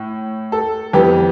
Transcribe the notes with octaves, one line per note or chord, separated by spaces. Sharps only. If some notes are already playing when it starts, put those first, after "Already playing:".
Already playing: A2
A4
F2 E3 B3 G4